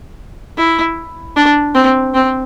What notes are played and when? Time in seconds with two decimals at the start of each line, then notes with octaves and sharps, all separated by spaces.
0.58 E4
1.36 D4
1.75 C4
2.14 C4